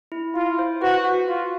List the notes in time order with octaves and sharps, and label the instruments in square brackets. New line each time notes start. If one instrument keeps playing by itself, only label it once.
[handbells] E4
[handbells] E4 [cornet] F4
[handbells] C5
[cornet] F#4 [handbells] B4
[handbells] F#4
[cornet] F4 [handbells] F#4